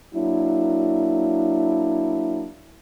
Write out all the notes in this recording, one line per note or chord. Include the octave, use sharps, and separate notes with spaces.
F#3 A#3 D4 E4